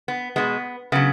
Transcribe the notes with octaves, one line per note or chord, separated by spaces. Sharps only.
B3
B2 G#3 B3
C#3 F#3 B3